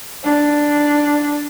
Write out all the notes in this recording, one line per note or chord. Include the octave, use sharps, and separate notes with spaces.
D4